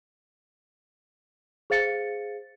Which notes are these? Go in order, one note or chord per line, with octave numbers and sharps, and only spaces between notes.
G#4 C5 F5 A6 C#7